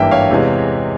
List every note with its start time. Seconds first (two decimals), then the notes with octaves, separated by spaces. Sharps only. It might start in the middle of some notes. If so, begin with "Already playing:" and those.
Already playing: G#1 G2 E3 A#3 E5 G5
0.11 C#5 F5
0.30 E2 C3 E3 G#3